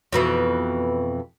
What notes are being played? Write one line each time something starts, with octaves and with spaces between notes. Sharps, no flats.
F2 B2 E3